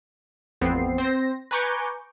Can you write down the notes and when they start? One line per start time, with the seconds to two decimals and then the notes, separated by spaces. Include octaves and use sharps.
0.61 A1 F2 B3 C4 C7
0.98 C4 C5 A#6
1.51 B4 G#5 A#5 C#6 D6 G6